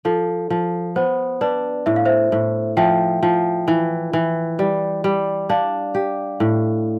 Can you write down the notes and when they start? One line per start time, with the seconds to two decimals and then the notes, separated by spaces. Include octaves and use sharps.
0.05 F3 A4
0.50 F3
0.96 B3 C5
1.41 D4 B4 D5
1.86 A2 E5
1.96 F5
2.05 C5 E5
2.32 A2
2.77 F3 E5 G5
3.23 F3
3.68 E3
4.13 E3
4.59 G3
5.04 G3
5.49 D4 D5 F5
5.95 G4
6.40 A2